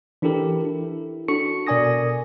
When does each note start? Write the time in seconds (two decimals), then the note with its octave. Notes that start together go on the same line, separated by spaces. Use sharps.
0.22 E3 D4 E4 G4 A4 A#4
0.65 E4
1.28 D4 F#4 A4 C#6 C#7
1.67 B2 A#4 D5 G#5 D#6 A#6